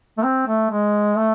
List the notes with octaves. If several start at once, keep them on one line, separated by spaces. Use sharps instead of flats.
A3
C4
A3
G#3
A3